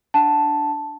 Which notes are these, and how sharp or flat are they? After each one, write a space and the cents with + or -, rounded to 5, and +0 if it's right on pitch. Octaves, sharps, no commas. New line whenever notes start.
D4 +0 F#5 +0 A5 +0